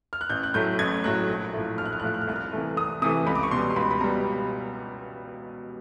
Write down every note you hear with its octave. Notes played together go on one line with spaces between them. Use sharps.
F6
F#6
A1 G6
F#6
A2 F#3 A3 G6
A1 G#6
A2 F#3 A3 F#6
A#1
A2 F3 A3
A#1 F6
F#6
F6
F#6
A2 F3 A3 F6
F#6
F6
C2 F#6
F6
C3 E3 A3
C2 D#6
C3 E3 A3 D#6
C#2 B5
D6
C#6
B2 G3 C6
C6
C#2 B5
B5
B2 G3 A#5